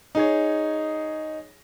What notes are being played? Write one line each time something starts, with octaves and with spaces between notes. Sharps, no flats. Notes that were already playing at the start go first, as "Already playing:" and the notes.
D#4 G#4 C#5